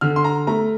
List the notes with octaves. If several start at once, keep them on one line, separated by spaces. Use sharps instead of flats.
D3 F6
C6
A#5
A3 A#5